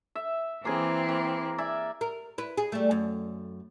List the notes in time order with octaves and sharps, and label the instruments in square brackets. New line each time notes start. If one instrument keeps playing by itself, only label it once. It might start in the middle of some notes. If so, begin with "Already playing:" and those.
[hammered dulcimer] E5
[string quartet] E3 C4 [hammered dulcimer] A#3 G4 G#4
[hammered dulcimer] A#3
D5 E5 G#5
[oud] A#4
E4 B4
G#4
G3 A3
F#2